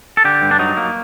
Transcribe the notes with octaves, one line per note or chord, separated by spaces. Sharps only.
A4
D3 G4
G2
D4
F#3 D#4
A#3